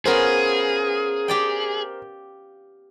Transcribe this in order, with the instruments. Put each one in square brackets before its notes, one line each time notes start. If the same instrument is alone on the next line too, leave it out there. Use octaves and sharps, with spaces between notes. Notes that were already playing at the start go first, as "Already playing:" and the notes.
[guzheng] B3 C#4 F4 [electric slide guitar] G#4 [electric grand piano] A#4 C5
[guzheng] G4 D5 G5